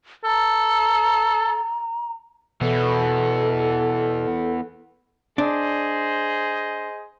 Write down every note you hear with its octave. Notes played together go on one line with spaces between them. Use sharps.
A4 A#5
B2 E3 B3 A4
D4 G#4 C5 D#5